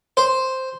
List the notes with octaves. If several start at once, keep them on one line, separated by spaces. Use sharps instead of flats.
C5